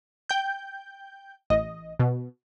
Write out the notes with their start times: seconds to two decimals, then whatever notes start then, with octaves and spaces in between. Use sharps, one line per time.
0.29 G5 G6
1.50 A1 D#5
2.00 B2